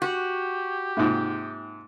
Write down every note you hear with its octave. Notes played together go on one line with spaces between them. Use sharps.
F#4 G4
G#2 C3 A#3 D#4 F4